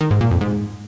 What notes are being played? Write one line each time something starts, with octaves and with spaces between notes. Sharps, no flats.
D#3
G#2
A#2
F2
G#2